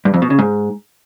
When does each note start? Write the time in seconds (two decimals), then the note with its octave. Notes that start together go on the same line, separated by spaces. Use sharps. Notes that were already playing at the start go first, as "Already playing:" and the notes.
0.05 G2
0.14 F2
0.22 B2
0.30 C#3
0.39 G#2